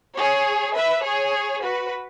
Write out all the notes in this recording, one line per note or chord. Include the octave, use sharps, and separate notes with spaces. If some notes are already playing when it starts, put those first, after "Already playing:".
G#4 C#5
B4 E5
G#4 C#5
F#4 B4